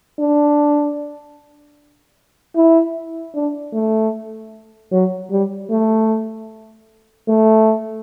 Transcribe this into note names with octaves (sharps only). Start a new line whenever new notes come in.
D4
E4
D4
A3
F#3
G3
A3
A3